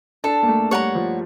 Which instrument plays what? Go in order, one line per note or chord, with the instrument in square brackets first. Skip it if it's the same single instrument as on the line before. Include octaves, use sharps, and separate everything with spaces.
[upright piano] D4 [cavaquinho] A4
[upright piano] A#3
A3
[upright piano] G3 [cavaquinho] C#5 F#5 A#5
[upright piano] F3